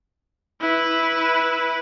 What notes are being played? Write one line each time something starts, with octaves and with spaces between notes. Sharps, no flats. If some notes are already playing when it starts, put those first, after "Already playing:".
E4 B4